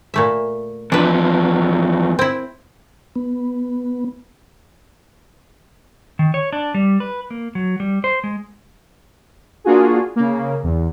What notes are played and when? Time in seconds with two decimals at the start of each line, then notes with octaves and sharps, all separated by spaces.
0.14 A#2 A3 E5
0.92 E2 F3 D4 B4
2.19 C4 E4
3.16 B3
6.19 D#3
6.34 C#5
6.53 D4
6.74 G3
7.00 B4
7.31 A#3
7.55 F#3
7.80 G3
8.04 C5
8.24 G#3
9.64 A#3 D4 F4 F#4 G#4
10.16 C#3 A#3
10.64 E2